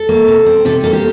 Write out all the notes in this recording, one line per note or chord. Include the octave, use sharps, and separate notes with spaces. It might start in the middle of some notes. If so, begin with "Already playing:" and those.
Already playing: A4
A#3
C3
C4
C3 A4
A#3 A4
G4